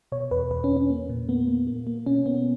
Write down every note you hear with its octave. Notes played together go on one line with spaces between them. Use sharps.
B2 C#5
E2 B4
E2 B4
C#4
E2
C#4
A#3
A#2
A#3 B3
A#3
A#3
A#3
B2 C#4
A#3 B3